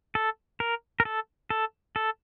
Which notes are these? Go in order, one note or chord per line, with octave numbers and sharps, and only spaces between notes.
A4
A#4
A#4
A4
A4
A4